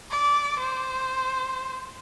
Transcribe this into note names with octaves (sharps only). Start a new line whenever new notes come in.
D5
C5